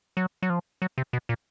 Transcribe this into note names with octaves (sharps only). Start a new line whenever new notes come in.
F#3
F#3
F3
F#3
C3
B2
A#2